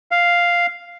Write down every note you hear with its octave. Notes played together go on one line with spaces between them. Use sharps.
F5